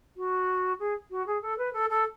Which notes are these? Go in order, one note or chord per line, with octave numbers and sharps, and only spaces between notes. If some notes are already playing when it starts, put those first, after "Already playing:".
F#4
G#4
F#4
G#4
A4
B4
A4
A4